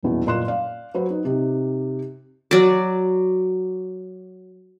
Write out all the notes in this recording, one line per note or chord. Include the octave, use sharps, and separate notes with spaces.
D#1 E2 B2
F#1 A#2 D#5 C6 F#6 E7
D5 F5
F#3 F#4 B4 C5
D#4
C3 D#4 G4
F#3 D5